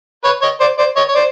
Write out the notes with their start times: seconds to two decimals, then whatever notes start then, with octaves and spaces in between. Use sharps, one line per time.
0.24 B4 C#5
0.42 C#5 D#5
0.60 C5 D5
0.78 C5 D5
0.96 C#5 D#5
1.08 C#5
1.14 C5 D5